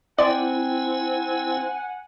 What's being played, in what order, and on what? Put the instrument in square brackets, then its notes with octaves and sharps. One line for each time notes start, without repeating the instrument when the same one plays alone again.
[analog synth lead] C4 [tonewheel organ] E4 [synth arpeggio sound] D5 [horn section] F#5 G#5